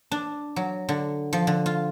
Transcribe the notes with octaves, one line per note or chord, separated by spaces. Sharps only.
D4
F#3
D3
F3
D3
F4